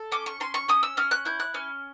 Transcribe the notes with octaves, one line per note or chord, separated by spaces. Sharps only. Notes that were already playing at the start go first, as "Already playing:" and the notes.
Already playing: A4
C#4 D6
C#6
C#4 C6
C#6
C#4 D#6
E6
C#4 F6
F#6
E4 G6
F#6
C#4 F6